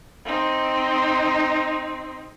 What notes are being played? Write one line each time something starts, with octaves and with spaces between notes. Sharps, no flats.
C4 D#4